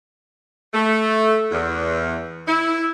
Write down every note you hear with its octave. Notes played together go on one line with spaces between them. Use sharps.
A3
E2
E4